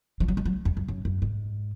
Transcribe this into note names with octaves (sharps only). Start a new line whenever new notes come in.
F3
F#3
G#3
F#3
F2
F#2
F#2
F#2
G#2